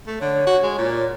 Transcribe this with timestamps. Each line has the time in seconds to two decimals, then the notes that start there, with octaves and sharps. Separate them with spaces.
0.06 A3
0.21 D3 C#5
0.47 F#4
0.63 G#3
0.78 A#2